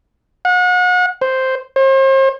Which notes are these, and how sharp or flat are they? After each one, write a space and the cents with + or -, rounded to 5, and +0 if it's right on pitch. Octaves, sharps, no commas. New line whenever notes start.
F#5 -35
C5 +0
C5 +40